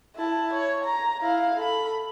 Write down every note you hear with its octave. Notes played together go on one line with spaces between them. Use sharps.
E4 A5
C#5
A#5
E4 F5
A4 B5